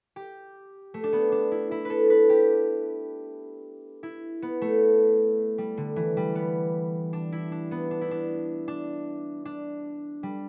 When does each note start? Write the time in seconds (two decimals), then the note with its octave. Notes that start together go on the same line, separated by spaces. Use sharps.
0.16 G4
0.94 A3
1.04 D4
1.13 B3
1.32 D4
1.51 E4
1.71 E4
1.85 A4 B4
2.10 B4
2.30 G4
4.03 E4
4.42 B3
4.61 A3
5.58 G3
5.77 D3
5.96 E3
6.17 G3
6.35 B3
7.13 D4
7.32 E4
7.52 D4
7.71 B3
7.91 D4
8.01 E4
8.11 D4
8.68 D4
9.45 D4
10.23 G3